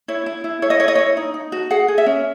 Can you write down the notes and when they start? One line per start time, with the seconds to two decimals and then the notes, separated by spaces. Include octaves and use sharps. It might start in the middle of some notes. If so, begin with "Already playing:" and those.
0.08 E4 C#5
0.26 E4
0.44 E4
0.62 E4 C#5
0.70 D#5
0.80 E4 C#5
0.88 D#5
0.95 C#5
0.98 E4
1.17 D#4
1.34 D#4
1.52 F#4
1.70 G#4 F#5
1.88 G#4
1.98 E5
2.06 C#4